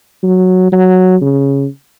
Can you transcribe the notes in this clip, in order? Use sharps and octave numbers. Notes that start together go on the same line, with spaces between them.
F#3
F#3
C#3